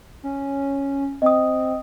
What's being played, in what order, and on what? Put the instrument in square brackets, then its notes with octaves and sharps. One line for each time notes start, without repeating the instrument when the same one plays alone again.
[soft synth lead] C#4
[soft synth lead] C4 [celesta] D#5 D#6